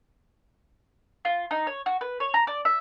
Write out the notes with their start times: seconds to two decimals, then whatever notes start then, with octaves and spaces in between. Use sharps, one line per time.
1.25 F4
1.51 D#4
1.67 C#5
1.86 F#4
2.01 B4
2.20 C#5
2.34 A#5
2.47 D5
2.65 E5